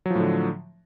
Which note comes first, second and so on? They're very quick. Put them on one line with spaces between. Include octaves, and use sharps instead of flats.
F#3 F3 A2 D3